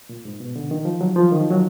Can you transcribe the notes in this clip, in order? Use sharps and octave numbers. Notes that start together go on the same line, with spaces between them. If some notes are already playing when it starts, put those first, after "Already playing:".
A#2
G#2
B2
D3
D#3
F3
F#3
F3
D#3
F3
F#3